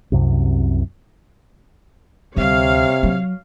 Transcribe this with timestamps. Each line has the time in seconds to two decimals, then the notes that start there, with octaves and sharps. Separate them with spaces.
0.12 C2 F#2 C3
2.36 D2 C3 G3 C#5 F5
3.03 F#3